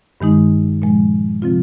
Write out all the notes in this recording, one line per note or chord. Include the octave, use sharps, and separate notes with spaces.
G2 D#3 G#3 D#4
A#2 F3 G#3
C3 F3 C4 F4